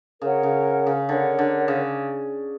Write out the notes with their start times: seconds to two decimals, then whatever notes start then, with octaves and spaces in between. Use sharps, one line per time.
0.22 C#3 A#4 C#5 F#5
0.43 C#3
0.86 C#3
1.09 D3 A#4 C#5 F#5
1.39 D3
1.68 C#3